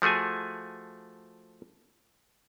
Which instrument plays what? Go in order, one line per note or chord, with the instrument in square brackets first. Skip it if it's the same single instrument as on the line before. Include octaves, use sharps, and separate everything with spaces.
[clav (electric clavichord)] F3 A3 F#4 G#4 G#5